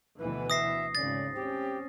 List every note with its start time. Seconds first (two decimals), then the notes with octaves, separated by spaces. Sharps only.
0.18 D2 B2 E3 B4
0.50 E5 D#6 A#6 C7
0.95 G#1 C#3 D5 A6
1.35 C4 C#4 G4